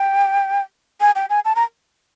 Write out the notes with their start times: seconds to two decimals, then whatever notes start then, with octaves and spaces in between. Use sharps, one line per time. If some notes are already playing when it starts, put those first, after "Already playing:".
Already playing: G5
1.01 G#5
1.15 G5
1.30 G#5
1.45 A5
1.56 A#5